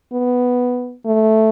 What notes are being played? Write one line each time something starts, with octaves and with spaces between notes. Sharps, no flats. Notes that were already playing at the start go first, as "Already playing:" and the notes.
B3
A3